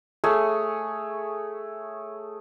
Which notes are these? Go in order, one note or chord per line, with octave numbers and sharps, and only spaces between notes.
A3 G#4 C#5